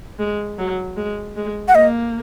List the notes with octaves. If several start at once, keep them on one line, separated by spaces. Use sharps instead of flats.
G#3
F#3
G#3
G#3
F#5
A#3 D#5